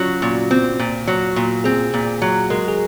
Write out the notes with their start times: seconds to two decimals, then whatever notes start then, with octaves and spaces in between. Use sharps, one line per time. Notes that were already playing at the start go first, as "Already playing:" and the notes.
Already playing: F#3 C#4 F4 F#4
0.22 A#2
0.51 C4
0.79 A#2
1.07 F#3
1.36 A#2
1.64 C4 G#4
1.94 A#2
2.22 F#3
2.50 G#3 A#4
2.68 G#4